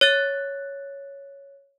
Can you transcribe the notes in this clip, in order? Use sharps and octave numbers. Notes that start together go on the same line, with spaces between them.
C#5 F#6 A6